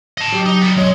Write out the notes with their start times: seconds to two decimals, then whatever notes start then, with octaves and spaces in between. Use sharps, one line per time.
0.18 D#5 A5
0.32 F#3 G4
0.46 D#4
0.61 G3 B3
0.77 B1 F#2 G#3 C#5